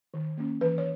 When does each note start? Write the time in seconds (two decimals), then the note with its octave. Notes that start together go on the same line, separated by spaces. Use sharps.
0.14 D#3
0.37 A#3 C#4
0.61 E3 B4
0.78 C#5